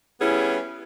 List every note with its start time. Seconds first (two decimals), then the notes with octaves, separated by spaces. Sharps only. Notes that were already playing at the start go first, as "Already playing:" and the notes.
0.21 G3 B3 C#4 E4 G#4